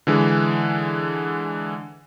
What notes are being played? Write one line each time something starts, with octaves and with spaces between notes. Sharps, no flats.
D3 E3 G#3